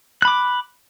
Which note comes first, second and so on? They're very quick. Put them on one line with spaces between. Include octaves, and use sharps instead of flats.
F#6 B5 D6